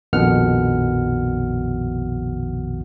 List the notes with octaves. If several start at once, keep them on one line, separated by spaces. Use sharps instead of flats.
A#1 F2 B2 D#3 F#5 F6